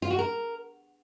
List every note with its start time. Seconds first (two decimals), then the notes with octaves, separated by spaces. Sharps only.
0.02 F4
0.10 F#4
0.19 A#4